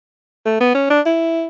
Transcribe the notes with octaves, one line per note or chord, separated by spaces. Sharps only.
A3
B3
C#4
D4
E4